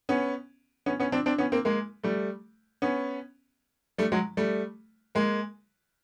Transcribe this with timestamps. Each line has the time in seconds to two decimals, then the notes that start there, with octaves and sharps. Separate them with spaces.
0.09 B3 C#4
0.86 B3 C#4
1.00 B3 C#4
1.12 C4 D4
1.26 C4 D4
1.38 B3 C#4
1.52 A#3 C4
1.65 G#3 A#3
2.03 G3 A3
2.82 B3 C#4
3.98 G3 A3
4.12 F#3 G#3
4.37 G3 A3
5.15 G#3 A#3